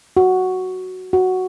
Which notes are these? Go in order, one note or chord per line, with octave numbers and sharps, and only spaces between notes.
F#4
F#4